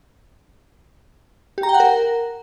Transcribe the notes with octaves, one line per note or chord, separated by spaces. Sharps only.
G4
A#5
G5
F#5
A#4